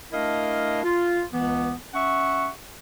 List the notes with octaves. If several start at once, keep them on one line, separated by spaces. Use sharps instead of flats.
A3 D4 E4 A#4 D#5 F5
F4
C#2 E3 B3
C#4 E5 F#5 C#6